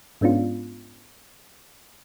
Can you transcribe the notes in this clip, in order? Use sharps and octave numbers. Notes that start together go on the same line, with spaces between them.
G#2 G#3 B3 C#4 D4 F4